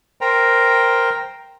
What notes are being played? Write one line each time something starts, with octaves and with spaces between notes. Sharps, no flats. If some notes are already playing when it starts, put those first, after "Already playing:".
A#4 C5 G5 A#5